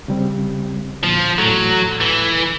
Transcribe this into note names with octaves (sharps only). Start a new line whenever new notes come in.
C#3 G3 C4
D2 A#2 F3
E2 A2 F#3 A4
E3